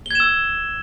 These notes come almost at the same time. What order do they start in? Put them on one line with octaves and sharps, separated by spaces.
G7 G#6 E7 E6